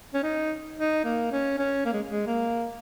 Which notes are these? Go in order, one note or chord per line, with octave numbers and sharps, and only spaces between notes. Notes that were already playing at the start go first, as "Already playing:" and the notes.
C#4
D#4
D#4
A#3
C#4
C#4
A#3
G#3
G#3
A#3